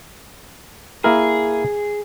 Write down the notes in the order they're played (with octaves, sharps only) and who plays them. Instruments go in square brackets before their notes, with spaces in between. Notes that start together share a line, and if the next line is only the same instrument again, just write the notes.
[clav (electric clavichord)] A#3 E4 A#4 [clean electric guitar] G#4